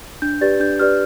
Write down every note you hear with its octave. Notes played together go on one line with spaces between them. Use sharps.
D4 G6
G4 B4 D5 A6
D4 G6
G4 B4 D5 F6